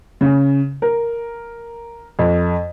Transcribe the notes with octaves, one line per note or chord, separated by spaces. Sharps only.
C#3
A#4
F2